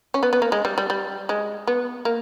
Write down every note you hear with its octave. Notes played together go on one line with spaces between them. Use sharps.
C#4
B3
B3
A#3
G#3
G3
G3
G3
G#3
B3
A#3